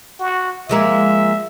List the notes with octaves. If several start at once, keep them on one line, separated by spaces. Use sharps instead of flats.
F#4
F3 G#3 A#3 E5